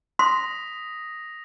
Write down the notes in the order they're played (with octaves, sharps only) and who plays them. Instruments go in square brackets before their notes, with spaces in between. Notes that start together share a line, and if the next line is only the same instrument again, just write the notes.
[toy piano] C6 [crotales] D#6 A#6 B6